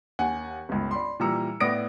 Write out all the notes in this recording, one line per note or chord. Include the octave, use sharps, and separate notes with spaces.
D#2 F#5 G#5
G1 C#2
D5 B5 C6
A#2 E3 G3 A#5 E6 C#7
A2 B3 D5 D#6 A#6 D7